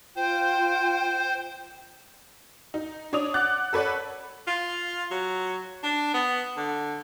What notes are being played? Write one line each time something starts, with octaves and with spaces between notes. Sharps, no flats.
F4 C5 G5
D#4
D4 C#5 D5 D#6 F7
F#5 D6 F#6 A6
A4 B4 C#5 D5 F#5
F4
F#3
D4
B3
D3